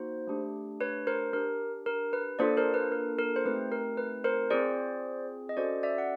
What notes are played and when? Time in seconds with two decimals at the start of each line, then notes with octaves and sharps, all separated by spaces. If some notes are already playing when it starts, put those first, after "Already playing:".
Already playing: A#3 D#4 F#4 C5
0.27 A3 D4 G4
0.81 B4 C#5
1.07 A#4 C5
1.33 D4 G4 A#4
1.86 A#4
2.13 B4
2.39 A#3 D4 F4 A4 C5 D5
2.57 A#4 C5
2.74 B4
2.92 A#4
3.19 A#4
3.36 C5
3.45 A3 C4 D#4 G4 B4
3.72 A#4
3.98 B4
4.24 A#4 C5
4.50 C4 F4 G#4 C5 D5
5.49 D#5
5.57 C#4 F#4 A4 C5 D5
5.83 D5 E5
5.98 F#5